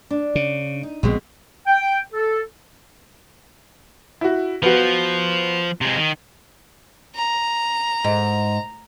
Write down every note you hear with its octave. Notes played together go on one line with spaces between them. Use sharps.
D4
C#3
D#4
A#1 B2 G#3 C4
G5
A4
E4 F#4
F3 B3 F#4
C3 G#3
D#3
A#5
G#2